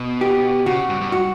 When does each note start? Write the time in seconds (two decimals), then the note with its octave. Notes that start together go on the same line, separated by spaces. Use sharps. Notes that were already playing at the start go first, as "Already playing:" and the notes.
Already playing: B2
0.21 G4
0.66 C#3 F#4
0.89 G2
1.01 G2
1.12 F#4